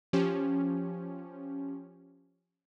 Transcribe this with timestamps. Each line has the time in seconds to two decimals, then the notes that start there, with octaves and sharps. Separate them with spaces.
0.13 F3 C#4 G4